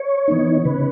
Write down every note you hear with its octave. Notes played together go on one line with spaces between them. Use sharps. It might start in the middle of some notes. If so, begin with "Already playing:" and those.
Already playing: C#5
E3 B3 D#4
C#3 B4